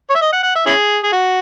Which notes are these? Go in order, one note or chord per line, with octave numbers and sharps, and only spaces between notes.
C#5
E5
D#5
F#5
F#5
E5
C#4 E4 G#4
G#4
F#4